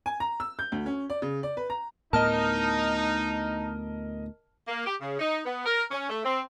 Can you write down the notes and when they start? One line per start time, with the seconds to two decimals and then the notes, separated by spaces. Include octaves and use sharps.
0.06 G#5
0.20 A#5
0.40 E6
0.59 G6
0.72 D2
0.86 C#4
1.10 D5
1.22 C#3
1.43 D5
1.57 B4
1.70 A#5
2.13 D2 A2 B3 D#4 A#4 D#5 A5 F6
4.68 A#3
4.86 G4
5.01 C#3
5.19 D#4
5.46 B3
5.66 A#4
5.91 C#4
6.09 A3
6.25 C4